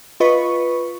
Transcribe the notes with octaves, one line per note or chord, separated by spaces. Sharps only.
F4 B4 D#5 B5 C#6